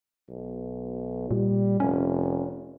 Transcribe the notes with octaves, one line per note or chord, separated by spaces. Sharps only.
B1
A#2 G3
F1 C#4